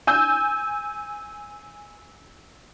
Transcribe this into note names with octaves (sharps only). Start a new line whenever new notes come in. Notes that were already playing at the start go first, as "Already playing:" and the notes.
G#5 E6 G6